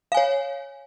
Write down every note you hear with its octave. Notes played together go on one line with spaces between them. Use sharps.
C#5 F5 G#5